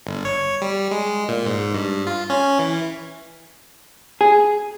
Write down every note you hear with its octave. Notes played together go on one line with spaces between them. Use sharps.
G1
C#5
G3
G#3
A#2
G#2
G2
F4
C#4
E3
G#4